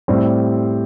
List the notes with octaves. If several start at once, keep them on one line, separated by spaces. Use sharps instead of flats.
A2 G3 C4